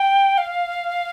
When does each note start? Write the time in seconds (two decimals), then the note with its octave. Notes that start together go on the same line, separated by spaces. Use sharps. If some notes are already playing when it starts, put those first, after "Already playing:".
Already playing: G5
0.38 F5